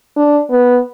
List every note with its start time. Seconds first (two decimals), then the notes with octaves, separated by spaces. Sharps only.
0.17 D4
0.50 B3